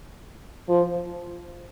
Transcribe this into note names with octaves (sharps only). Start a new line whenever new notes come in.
F3